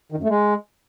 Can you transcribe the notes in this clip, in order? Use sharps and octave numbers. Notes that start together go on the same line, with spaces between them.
D#3
F#2
A3
G#3